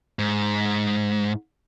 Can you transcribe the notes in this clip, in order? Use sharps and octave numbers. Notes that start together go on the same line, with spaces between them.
G#2